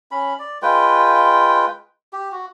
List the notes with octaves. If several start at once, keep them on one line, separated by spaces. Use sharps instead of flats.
C#4 B5
D5
G#3 F4 B4 G5
G4
F#4